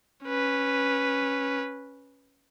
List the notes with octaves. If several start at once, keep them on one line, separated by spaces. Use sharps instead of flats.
C#4 B4